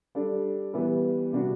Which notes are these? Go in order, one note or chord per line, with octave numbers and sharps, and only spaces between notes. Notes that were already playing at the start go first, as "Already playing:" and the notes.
G3 D4 A4 D5
E3 G3 B3
C3 G3 D4 F#4